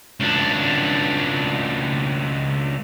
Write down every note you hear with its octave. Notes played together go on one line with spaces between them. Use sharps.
C#2 D4